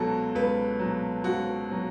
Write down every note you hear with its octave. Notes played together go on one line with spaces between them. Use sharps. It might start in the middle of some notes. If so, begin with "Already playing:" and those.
Already playing: C#2 B2 F#3 F#4 A4
C#2 B4
B2 F#3
C#2 F#4
B2 F#3